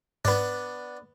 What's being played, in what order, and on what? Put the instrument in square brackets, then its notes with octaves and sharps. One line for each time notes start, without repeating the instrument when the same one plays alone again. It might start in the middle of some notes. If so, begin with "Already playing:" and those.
[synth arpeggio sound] G#2 [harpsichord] B3 D4